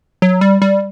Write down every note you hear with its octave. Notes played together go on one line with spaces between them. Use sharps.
F#3
G3
G3